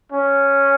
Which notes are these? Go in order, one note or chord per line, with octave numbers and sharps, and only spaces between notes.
C#4